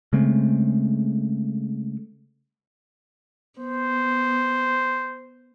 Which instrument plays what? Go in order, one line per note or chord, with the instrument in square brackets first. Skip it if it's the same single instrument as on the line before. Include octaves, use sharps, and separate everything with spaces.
[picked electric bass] C#3 G#3 A3 C4
[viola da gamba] B3 [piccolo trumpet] C5